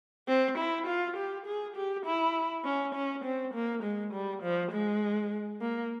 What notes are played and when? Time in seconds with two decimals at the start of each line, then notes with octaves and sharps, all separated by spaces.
0.28 C4
0.58 E4
0.87 F4
1.17 G4
1.46 G#4
1.76 G4
2.06 E4
2.65 C#4
2.95 C#4
3.24 C4
3.54 A#3
3.83 G#3
4.13 G3
4.42 F3
4.72 G#3
5.61 A#3